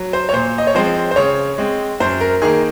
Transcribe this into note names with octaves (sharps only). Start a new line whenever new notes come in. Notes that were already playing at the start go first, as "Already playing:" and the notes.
Already playing: F#3
C5
C#5
A#2 C5
D#5
C#5
F3 G#3 C4 C5
C5
C#3 C#5
G#3 C4
F#2 C5
A#4
D#3 A#3 G#4